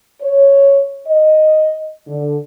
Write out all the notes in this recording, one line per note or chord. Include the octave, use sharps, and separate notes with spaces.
C#5
D#5
D3